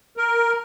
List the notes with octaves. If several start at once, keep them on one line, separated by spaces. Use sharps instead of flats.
A#4